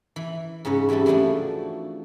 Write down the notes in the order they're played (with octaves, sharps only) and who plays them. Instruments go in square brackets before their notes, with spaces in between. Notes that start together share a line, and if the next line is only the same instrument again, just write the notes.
[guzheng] E3
G#2 C#3 C#4 B4
C3 E3 G3 E4 A4
E3 F3 A3 D4 F#4